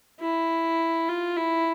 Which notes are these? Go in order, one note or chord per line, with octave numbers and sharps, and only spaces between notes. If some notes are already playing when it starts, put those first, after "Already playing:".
E4
F4
E4